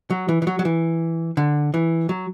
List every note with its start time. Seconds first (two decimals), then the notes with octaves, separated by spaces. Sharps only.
0.10 F#3
0.29 E3
0.42 E3
0.47 F#3
0.59 F#3
0.65 E3
1.37 D3
1.74 E3
2.09 F#3